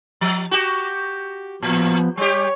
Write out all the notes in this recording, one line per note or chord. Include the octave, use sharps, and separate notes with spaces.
F3
F#4 G4
A2 F3 B3
G3 G4 C#5